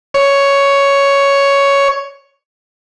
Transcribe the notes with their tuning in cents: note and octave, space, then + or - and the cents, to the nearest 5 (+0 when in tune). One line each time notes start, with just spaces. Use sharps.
C#5 +5